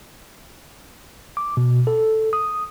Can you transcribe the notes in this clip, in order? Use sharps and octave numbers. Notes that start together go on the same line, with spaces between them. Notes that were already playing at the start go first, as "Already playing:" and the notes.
D6
B2
A4
D#6